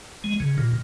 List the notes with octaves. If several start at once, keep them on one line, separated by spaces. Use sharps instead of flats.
G#3
C#3
A#2